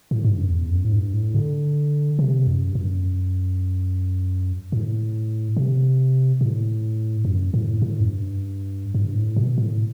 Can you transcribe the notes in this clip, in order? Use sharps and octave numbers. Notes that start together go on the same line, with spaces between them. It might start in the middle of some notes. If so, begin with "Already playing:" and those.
A2
G2
F#2
E2
F#2
A2
G2
A2
D3
C3
F#2
G2
F#2
A2
C3
A2
F#2
A2
A2
F#2
G2
G2
A2
B2
A2